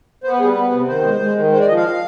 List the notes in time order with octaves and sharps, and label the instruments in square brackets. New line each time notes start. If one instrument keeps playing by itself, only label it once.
[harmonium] B3 C5
B4
G3 G#4
B4
B3
C3
D#3 C5
G#3
G#3
D#3
G#3 C5
D5
F3 D#5
F5